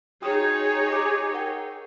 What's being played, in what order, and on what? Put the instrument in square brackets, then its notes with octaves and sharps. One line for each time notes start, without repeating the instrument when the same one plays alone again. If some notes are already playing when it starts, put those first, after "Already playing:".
[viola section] D#4 G#4 C#5 [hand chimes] F#4 G5 D#6
[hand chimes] D6
A#4 F#5 G5